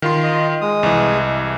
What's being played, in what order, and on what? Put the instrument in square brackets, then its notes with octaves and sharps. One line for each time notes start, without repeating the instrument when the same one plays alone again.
[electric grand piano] D#3 F4 C6
[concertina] D#5
G#3 D#6
[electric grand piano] C2 E3